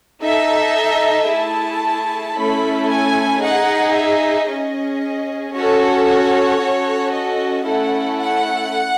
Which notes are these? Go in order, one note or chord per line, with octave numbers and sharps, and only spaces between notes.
D#4 A4 E5
A3 E4 G#4 A5
A3 C#4 E4 A4 B5
G#5
D#4 G#4 F#5
E5
C#4 G#4 D#5
C#4 F#4 A4 C#5
C#5
C#4 F#4 A4
D#5
A3 C#4 E4 A4 F#5
F#5